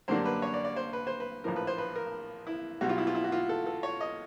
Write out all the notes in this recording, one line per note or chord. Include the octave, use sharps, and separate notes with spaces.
F#2 D3 G3 A#3 D4 C5
B4
C#5
D5
D5
C5
B4
C5
B4
A#1 A2 F3 A#4
B4
C5
B4
A#4
E4
B1 B2 G3 F#4
F4
E4
F4
E4
F#4
F4
A4
A4
C#5
D#5